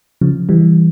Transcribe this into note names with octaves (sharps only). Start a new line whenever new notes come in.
C#3 F3
E3 G3